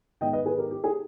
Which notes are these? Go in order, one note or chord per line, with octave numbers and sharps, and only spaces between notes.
G#2 D#3 G#3 B3 D#5 G5
B4 D#5
G#4 B4
G4 A#4
G4
G#4